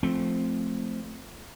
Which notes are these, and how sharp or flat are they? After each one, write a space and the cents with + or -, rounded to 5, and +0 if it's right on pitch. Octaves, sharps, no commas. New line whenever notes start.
F3 +0 A3 -10 C4 +0